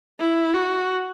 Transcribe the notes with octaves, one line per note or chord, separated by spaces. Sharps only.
E4
F#4